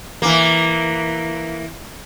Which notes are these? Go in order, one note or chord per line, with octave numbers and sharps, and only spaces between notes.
E3 A#3